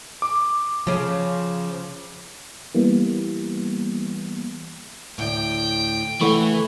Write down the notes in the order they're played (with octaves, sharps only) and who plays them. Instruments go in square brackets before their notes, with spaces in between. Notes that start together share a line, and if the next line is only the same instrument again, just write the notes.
[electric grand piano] D6
[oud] C#3 C#4 [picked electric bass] F3
[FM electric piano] E3 G3 A#3 B3
[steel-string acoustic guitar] D2 A2 [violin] G5
[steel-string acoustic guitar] C#3 A4 F#5 [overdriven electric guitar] E3 [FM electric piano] A3 C#6